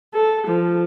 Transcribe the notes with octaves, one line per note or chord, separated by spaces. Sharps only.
A4
F3